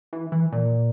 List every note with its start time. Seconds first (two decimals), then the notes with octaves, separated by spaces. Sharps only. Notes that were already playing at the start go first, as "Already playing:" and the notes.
0.13 E3
0.32 E3
0.52 A#2